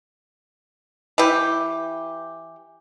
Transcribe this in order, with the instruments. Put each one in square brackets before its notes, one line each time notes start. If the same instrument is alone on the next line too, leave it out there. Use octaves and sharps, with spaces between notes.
[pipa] E3 G4